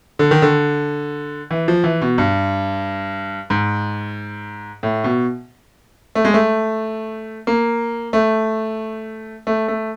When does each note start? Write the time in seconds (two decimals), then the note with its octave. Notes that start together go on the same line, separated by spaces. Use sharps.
0.19 D3
0.31 D#3
0.42 D3
1.51 E3
1.68 F3
1.84 E3
2.01 B2
2.18 G2
3.50 G#2
4.83 A2
5.04 B2
6.15 A3
6.25 G#3
6.34 A3
7.47 A#3
8.13 A3
9.47 A3
9.68 A3